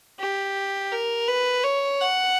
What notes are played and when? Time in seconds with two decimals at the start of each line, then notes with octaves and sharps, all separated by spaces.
0.20 G4
0.92 A#4
1.28 B4
1.64 C#5
2.00 F#5